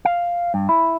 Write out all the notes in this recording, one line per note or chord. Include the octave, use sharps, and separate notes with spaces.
F5
G2
E4